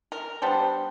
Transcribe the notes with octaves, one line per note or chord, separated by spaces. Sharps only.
A#4
G3 B3 D4 C5